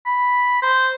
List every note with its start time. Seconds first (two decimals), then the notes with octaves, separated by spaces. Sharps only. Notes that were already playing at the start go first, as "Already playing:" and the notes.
0.06 B5
0.62 C5